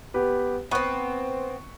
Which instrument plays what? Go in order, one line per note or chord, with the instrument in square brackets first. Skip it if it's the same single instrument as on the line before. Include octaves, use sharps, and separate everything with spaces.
[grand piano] B3 G4 B4
[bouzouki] B3 C4 [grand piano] B5 C#6 F#6